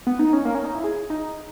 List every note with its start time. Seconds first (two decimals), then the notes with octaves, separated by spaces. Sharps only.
0.07 B3
0.19 D#4
0.33 C#4
0.45 A#3
0.55 C#4
0.65 D#4
0.74 E4
0.84 G#4
1.10 D#4